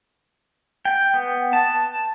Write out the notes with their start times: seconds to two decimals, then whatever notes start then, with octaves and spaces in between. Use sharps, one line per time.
0.85 G5
1.14 B3
1.53 A5